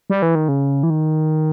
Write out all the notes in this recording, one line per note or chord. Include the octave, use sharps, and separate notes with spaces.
G3
E3
D#3
C#3
E3
D#3